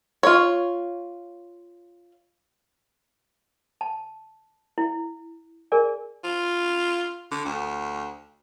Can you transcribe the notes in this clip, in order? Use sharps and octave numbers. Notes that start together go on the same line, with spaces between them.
F4 C#5
A5
E4
G#4 A#4 D5 G#5
F4
D3
D2